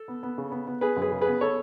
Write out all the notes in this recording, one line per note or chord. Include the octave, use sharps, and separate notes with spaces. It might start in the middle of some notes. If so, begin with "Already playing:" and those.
Already playing: A4
B3
B3
C#3
B3
B3
B3 G#4 B4
F#2
G#4 B4
C#3
G#4 B4
B3
A4 C#5